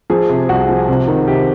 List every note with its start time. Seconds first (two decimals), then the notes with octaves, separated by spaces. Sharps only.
0.10 F3 G#4
0.29 C3
0.49 C2 F#4
0.69 F3
0.89 C3
1.08 D#3
1.27 C3 G4